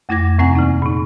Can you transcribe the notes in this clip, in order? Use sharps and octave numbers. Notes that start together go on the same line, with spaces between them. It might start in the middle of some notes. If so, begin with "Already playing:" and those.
F2 A3 E4 D6 G#6 A#6
D#2 C3 C4 F#5 G#5 A#5
E3 A#3 D#4
A#2 D#4